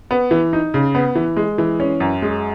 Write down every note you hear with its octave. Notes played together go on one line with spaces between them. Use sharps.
B3
E3
D#4
C#3
B3
E3
G#3
E3
C#4
F#2
G#3